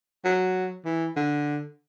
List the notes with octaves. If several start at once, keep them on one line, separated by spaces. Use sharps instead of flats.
F#3
E3
D3